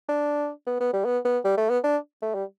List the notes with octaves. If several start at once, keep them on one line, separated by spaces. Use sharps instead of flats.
D4
B3
B3
G3
B3
B3
G3
A3
B3
D4
A3
G3